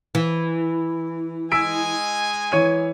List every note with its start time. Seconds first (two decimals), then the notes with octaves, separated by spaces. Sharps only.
0.15 E3
1.52 G#3 D#5 G#5 E6 B6 D7
2.52 E3 C#5 D#7